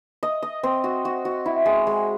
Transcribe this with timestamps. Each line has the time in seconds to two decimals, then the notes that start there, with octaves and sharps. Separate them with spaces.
0.23 D#5
0.43 D#5
0.63 C4
0.84 F#4
1.05 F#4
1.25 F#4
1.46 E4
1.66 G#3
1.87 G#3